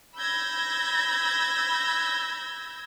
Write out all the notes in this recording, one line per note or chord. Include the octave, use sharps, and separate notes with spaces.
B5 E6 G6 G#6 A#6